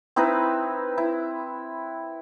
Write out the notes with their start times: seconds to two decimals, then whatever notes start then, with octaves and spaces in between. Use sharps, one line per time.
0.16 C4 D#4 E4 B4
0.98 E4